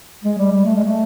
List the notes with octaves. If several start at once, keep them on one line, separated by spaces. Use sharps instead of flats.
G#3
G3
G3
A3
G#3
A3